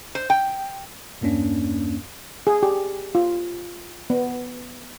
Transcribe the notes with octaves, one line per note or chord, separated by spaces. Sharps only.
C5
G5
E2 G2 A#3 C#4 D4
G#4
G4
F4
B3